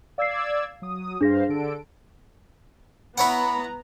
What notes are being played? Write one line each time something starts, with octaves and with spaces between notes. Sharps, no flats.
D5 F5 E6 G#6 C7
F#3 D#6
G2 D4 G#4 C5 F5 A#6
D3 A4 D7
B3 E4 C#5 F#5 A#5 B5